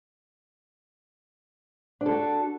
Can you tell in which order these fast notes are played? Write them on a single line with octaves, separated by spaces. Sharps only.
D4 A4 F#4